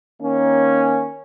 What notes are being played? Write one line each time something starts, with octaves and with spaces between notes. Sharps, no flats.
D#3 A#3 C#4